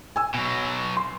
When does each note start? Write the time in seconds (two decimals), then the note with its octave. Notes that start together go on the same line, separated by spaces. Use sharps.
0.16 G#5 E6
0.34 B2 F#3
0.97 C6